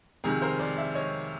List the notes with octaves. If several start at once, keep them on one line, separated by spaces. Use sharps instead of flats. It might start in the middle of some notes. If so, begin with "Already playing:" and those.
F2 C3 D#3 G#4 A#4
A#4 C5
C5 D5
D5 E5
C#5 D#5